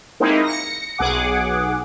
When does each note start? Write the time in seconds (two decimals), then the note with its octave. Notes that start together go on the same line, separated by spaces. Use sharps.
0.20 G#3 A#3 C4 D#4 E4
0.44 A#6 C#7
0.98 B1 G#4 F#5 D6